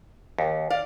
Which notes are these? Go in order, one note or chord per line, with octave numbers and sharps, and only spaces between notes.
D#2
D5 F5